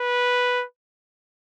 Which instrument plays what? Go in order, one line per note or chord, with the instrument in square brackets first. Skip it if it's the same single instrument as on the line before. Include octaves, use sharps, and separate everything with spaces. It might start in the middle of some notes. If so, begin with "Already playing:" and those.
Already playing: [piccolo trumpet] B4